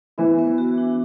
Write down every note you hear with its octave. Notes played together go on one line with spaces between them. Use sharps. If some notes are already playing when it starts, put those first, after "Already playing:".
E3 B3 E4
B3
F#4
D4